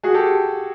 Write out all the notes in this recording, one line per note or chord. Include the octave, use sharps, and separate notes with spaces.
F#4 G#4
G4 A4